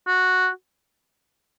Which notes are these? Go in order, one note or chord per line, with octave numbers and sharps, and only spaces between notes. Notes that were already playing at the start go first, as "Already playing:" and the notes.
F#4